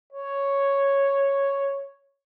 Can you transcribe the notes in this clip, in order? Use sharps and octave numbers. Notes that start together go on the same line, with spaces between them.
C#5